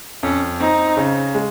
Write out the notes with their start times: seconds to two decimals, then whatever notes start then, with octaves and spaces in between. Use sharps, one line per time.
0.23 F2 C#4
0.60 C4 D#4
0.97 C#3
1.34 G#3